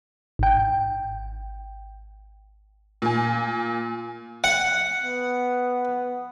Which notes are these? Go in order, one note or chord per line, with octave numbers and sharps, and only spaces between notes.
G#1 G5
A#2 G#5
F#5
B3